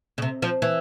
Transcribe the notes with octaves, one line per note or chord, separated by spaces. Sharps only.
C#3
C3
F3
E3